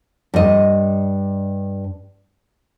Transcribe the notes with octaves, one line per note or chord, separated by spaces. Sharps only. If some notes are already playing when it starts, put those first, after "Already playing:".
G2 D#5